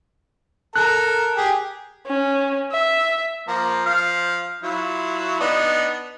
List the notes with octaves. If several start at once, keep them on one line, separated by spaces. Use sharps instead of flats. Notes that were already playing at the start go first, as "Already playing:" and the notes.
A4 A#4 A#5 F#6
G4 G#4
C#4
E5
F3 A#3 A#5
F3 F5
F#3 E4 F4
B3 D4 D#4